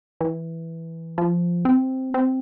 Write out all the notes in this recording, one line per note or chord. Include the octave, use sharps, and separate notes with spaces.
E3
F3
C4
C4